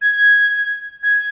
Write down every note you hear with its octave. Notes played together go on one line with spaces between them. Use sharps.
G#6
G#6